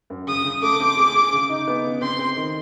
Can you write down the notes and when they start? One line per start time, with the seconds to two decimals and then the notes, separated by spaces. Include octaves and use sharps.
0.10 F#2
0.27 C#3 D#6
0.44 C#3
0.62 A3 D6
0.80 C4
0.97 G#4
1.15 G#4
1.33 C#3
1.50 D#4
1.67 B3
1.85 C#3
2.01 C4 C6
2.19 C4
2.37 D#3